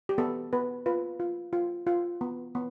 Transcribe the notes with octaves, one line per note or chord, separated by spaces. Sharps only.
G4
B3 A4
B3 B4
F4 B4
F4
F4
F4
B3
B3